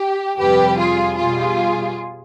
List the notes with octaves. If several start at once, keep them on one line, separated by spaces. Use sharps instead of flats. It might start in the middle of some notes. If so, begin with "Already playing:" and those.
Already playing: G4
F2 C3 G3 G4 B4
F4 G#4
B2 G3 F4 G#4